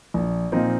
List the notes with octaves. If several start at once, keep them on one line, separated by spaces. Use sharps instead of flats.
A#1
A#2 F3 C4 D#4